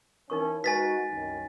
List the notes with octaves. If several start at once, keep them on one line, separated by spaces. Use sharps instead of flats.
E3 B3 C#4 D#4 A#4 C#6
G#3 D#4 F#4 B4 G#5 A6 B6
C2 F#2 D#3